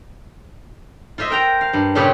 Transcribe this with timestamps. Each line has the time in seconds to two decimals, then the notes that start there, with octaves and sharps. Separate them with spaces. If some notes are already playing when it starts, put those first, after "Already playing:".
1.18 F4 C5 D#5 E5
1.30 A#4 G5 A#5
1.61 F5
1.73 G2
1.95 A#2 C#3 F4 G4 C#5 B5